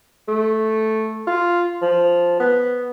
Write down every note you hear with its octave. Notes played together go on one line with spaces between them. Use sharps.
A3
F4
F3
B3